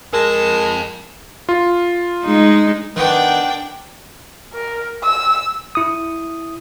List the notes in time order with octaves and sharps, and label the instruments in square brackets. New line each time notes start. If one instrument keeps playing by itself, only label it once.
[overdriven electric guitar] F2 A5 [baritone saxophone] G#3 [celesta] A#4
[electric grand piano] F4
[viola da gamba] G#3 D#4
[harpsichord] D#3 B3 [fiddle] D4 G5
[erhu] A#4
E6
[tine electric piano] E4 D#6